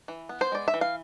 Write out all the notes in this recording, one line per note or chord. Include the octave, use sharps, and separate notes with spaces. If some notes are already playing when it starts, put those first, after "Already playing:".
E3
B3
C5
G#3 D5
E5
E3
F5